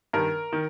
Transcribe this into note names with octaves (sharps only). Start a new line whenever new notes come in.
G2 D#3 A#4
D#3